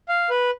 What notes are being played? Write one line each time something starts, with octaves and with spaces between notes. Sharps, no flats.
F5
B4